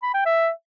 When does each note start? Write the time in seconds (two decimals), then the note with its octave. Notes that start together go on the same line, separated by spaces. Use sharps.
0.03 B5
0.14 G5
0.26 E5